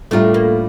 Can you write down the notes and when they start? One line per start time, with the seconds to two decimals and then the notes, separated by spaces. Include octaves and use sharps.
0.11 A2 G3 A3 D4 F4 A#4
0.34 A#3